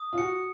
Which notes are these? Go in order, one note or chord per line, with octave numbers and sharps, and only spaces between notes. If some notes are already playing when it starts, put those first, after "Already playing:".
Already playing: D#6
F4
F#4 C#7